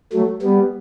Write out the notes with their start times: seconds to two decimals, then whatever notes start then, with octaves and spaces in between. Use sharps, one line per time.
0.13 F#3 A3
0.42 G3 B3